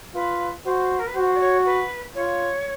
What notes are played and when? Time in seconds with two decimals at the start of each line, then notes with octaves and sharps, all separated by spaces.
0.15 F4 B4
0.65 F#4 C5
0.99 A#4
1.07 B4
1.15 F#4 C5
1.36 D5
1.40 C#5
1.66 B4
2.15 F4 C#5